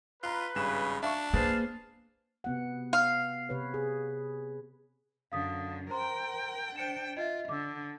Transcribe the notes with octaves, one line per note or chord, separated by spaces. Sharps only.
F4 B4 A#5 F#6
G#1 G2 C#3 E7
D4 E5 F5 C#6
A#3 G#4 B4 C5 F5 A5
C3 B3 F#5
F5
C3 B4 C#5
G#4
F#2 D3 F5 D#6 B6
A#4 C5 G5 A#5 C6
D4 C5 G5 C#7 E7
F4 D#5 E5
D3 D6 E6